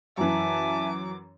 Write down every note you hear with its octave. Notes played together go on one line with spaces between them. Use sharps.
F#2 E3 E5 G#5 A5 D6